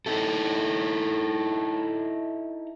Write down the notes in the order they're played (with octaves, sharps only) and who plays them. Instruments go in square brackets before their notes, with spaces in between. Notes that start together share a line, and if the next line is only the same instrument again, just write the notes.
[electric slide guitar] D#4 E4 A4